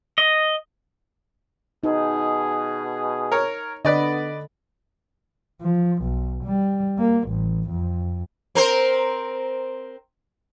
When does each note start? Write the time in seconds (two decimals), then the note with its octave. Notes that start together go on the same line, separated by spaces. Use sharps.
0.18 D#5
1.84 B2 D#4 G#4
3.32 A#4 C#5
3.85 D3 B3 B4 D5 D#5
5.61 F3
6.03 B1
6.45 G3
6.98 A#3
7.29 A1
7.70 F2
8.55 C4 A#4 C5